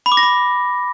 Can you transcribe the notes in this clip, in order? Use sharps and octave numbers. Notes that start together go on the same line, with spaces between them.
B5
D6
A#6
B5